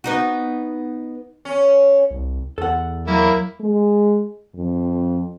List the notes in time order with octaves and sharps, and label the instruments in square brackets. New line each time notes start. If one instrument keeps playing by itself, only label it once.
[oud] B3 D#4 F#4
[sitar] C#4
[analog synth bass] C2
[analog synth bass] E2 [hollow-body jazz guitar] A4 F#5
[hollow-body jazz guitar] F#3 [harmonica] A#3 E4
[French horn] G#3
F2